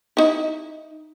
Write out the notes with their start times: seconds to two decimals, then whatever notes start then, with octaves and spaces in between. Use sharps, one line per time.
0.17 D#4 E4